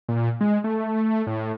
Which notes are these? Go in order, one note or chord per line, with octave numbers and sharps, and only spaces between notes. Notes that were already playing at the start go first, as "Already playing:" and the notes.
A#2
G#3
A3
A2